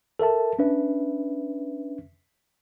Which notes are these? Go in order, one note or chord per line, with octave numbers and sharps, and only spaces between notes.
A4 A#4 E5 A5
C#4 D4 B4 E5